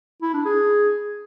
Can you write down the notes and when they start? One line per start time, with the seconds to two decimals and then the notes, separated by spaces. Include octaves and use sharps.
0.22 E4
0.34 D4
0.46 G#4